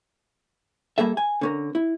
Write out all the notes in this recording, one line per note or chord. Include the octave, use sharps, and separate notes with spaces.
G3 A#3 G#4 A4 E5
G#5
D3 C#4 A#4
E4